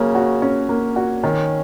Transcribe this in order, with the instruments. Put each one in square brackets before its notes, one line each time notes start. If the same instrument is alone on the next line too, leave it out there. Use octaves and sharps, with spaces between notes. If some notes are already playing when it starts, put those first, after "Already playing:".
Already playing: [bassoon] C#3 [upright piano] F#3 A#3
[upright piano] F#4
C#4
A#3
F#4
[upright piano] D#3 [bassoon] C#4